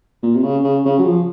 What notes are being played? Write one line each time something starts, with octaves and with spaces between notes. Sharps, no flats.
A#2
C3
C#3
C#3
C#3
F#3
F3